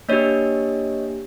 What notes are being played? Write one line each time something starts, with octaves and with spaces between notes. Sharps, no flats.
A#3 D4 G4 C#5 D#5